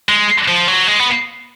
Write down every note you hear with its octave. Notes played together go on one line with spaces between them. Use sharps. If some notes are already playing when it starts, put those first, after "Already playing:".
G#3
F3
F#3
G#3
B3